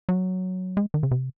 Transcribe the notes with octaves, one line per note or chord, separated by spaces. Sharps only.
F#3
G#3
D#3
C#3
C3